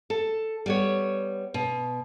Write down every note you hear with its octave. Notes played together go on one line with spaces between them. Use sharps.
A4
G3 B3 C#5
B2